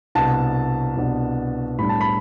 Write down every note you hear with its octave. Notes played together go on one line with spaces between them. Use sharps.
C2 B2 B3 D4 A5
C2 B2 B3 D4
A2 G3 B3 D4 B5
A5
B5